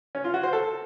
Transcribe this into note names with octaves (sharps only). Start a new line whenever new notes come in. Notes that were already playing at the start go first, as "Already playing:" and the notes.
C#4
F4
F#4
C5
A4